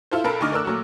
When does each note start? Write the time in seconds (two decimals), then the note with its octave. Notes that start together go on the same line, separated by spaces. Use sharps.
0.11 E4 F4 A4 C5
0.24 B1 A4 A#4 B5 D7
0.41 D2 D3 D#4 C#6 D6 F6
0.52 A3 D4 A#4 E6 F#6
0.65 A#2 F#3 A3 F#4